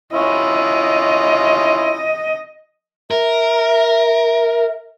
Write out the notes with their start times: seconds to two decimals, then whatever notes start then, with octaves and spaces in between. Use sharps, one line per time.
0.13 C#4 E4 F4 D#5
3.11 A#4 E5